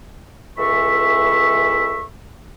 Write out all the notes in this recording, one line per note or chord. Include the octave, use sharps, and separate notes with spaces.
C#2 E3 A4 E5 B5 C#6